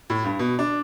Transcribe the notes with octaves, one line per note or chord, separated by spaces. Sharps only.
A2
G2
B2
D4